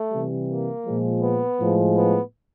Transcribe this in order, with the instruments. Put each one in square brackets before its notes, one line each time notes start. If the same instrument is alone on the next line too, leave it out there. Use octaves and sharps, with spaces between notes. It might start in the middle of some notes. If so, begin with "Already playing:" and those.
Already playing: [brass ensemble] A3
C3 E3 G3
A#3
A#2 F3 G#3
B3
A2 F3 G#3
B3